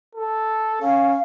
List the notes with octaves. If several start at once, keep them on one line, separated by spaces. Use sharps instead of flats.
A4
C#4 F5